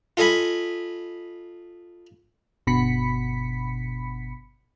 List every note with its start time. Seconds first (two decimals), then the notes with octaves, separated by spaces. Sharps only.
0.17 F4 A4 D#5 G#5 B5
2.67 G1 B2 B5 B6 C#7